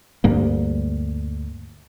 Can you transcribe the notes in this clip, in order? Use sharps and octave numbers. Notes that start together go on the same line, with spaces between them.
D2 G2 G3 A#3